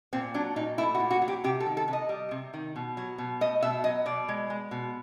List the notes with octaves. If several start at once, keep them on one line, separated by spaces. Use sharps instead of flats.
A#2 C4
F#3 D4
A#2 D#4
A3 E4
F#4
A#2
F#4
F#3
G4
C3 G4
A4
D#3
A4
C3
D#5
G3
C3
D#3
B2
F#3
B2
A3 D#5
B2 E5
F#3 D#5
B2 D5
G#3
G#3
B2